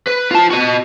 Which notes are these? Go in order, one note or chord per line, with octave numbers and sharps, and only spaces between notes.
B4
F4 A5
F#4 D#5